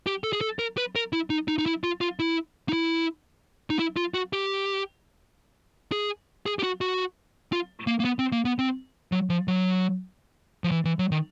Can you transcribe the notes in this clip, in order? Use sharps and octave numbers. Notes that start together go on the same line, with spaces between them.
G4
A4
G#4
A4
A#4
B4
A#4
E4
D#4
D#4
D#4
E4
F4
F4
E4
D#4
E4
D#4
E4
F4
F#4
G4
G#4
G#4
G4
F#4
F#4
F4
A#3
A#3
B3
C4
A#3
B3
C4
F#3
F3
F#3
F3
E3
E3
F#3
D#3